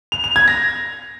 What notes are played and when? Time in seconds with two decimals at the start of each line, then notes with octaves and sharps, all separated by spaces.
0.12 F7
0.24 F7
0.36 G#6
0.48 A#6